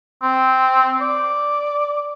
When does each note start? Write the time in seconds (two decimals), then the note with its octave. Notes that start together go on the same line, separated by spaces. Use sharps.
0.22 C4
1.01 D5